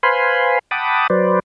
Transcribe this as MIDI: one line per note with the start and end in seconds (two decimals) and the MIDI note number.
0.03 0.59 71
0.03 0.59 72
0.03 0.59 77
0.03 0.59 80
0.03 0.59 83
0.03 0.59 84
0.71 1.07 78
0.71 1.07 79
0.71 1.07 81
0.71 1.07 83
0.71 1.07 86
0.71 1.07 87
1.10 1.39 54
1.10 1.39 71
1.10 1.39 72
1.10 1.39 74